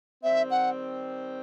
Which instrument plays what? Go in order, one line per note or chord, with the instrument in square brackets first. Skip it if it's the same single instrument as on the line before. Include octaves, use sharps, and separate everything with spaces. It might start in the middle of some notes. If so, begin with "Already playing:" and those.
[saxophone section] D#3 G3 C4 [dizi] E5
[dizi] F#5